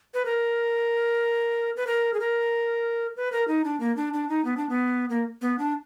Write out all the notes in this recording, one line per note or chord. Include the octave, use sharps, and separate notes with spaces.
B4
A#4
B4
A#4
G#4
A#4
B4
A#4
D#4
D4
A#3
D4
D4
D#4
B3
D4
B3
A#3
B3
D4